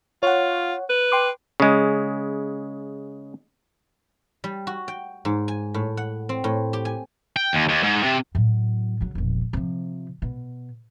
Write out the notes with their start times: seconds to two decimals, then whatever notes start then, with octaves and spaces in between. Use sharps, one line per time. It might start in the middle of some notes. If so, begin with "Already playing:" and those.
0.23 F4 C#5 F#5
0.89 B4
1.12 G5 C6 D6
1.60 C#3 G#3
4.44 G3
4.67 F#4
4.88 G5
5.25 G#2
5.48 G#5
5.74 A2
5.97 F#5
6.29 C4
6.44 A2
6.73 G4
6.85 G#5
7.36 G5
7.53 D#2
7.69 D#2
7.84 G#2
8.04 C3
8.35 A2 F#3
9.00 C#3 F#3
9.15 E1 A#1
9.53 C3 F3
10.22 B2